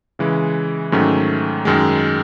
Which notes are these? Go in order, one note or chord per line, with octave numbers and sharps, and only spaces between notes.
C#3 E3 G#3
G#2 D#3 F#3 A3 C#4
F#2 D#3 G#3